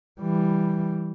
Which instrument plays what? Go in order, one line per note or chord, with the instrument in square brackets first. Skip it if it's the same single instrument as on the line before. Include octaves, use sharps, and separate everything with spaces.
[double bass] E3 G3